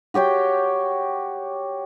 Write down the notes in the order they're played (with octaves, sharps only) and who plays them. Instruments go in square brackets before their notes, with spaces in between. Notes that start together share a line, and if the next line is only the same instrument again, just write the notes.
[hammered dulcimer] F#4 G4 C#5 G5